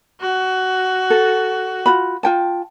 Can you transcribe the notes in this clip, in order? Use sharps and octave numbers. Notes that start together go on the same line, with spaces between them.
F#4
A4
F4 F#4 B5
F4 G5 A5